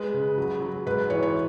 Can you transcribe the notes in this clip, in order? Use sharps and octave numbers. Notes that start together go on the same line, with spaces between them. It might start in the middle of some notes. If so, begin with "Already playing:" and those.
Already playing: G#3 B4
C#3
F#3
F#3
G#2 B4
E3 C#5
C#5